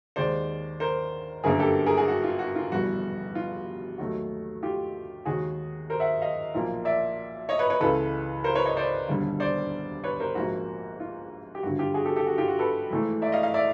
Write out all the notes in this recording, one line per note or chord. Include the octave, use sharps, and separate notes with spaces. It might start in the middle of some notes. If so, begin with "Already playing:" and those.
D#2 D#3 G#3 C5 D5
A#4 C5
G1 F#2 D3 F#3 A#3 G#4 A#4
G4 A4
G#4 A#4
F#4 G#4
F#4
F4
F#4
F4
F1 E2 B2 G3 F#4
F4
D#2 D#3 F#3 A3 F#4
F4 G4
D#2 D#3 G#3 F#4 G#4
A#4 C5
E5 F#5
D#5 F5
B1 A#2 F3 A#3
D5 E5
C#5 D#5
B4 C#5
B4 C#5
C#2 C#3 E3 A4 B4
A#4 C5
B4 C#5
C#5 D#5
C5 D5
E1 D#2 D3 G3
C5 D5
B4 C#5
A#4 C5
A#1 G#2 F3 A#3 F#4
F4
G4
G#1 G2 D3 F#4
F4 G4
F#4 G#4
G4 A4
G4 A4
F#4 G#4
F4 G4
F#4
A4 B4
G#1 G#2 E3 A3
D5 E5
D#5 F5
D#5 F5
D5 E5